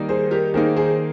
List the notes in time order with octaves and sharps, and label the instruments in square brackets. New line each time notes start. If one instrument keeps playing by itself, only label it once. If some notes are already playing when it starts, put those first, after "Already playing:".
Already playing: [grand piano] D#3 G3 A#3 D#4
[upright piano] G#4 C5
G4 A#4
[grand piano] D#3 A#3 D#4 [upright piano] G#4 C5
[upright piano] G#4 C5